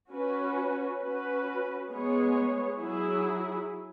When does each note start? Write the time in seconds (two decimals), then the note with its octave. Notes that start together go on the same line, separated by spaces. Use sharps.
0.11 C#4 F#4 B4
1.01 C#4 F#4 B4
1.90 G#3 B3 G#4 C#5
2.79 F#3 E4 G#4